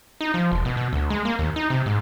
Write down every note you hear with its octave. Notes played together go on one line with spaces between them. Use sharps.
D#4
F3
E1
B2
B2
D2
G#3
A#3
D#2
D#4
C3
G#2